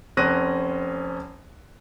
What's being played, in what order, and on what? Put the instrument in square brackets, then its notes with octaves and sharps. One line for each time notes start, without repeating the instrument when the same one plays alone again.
[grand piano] F1 C4 C#4 F#6 A#6 D#7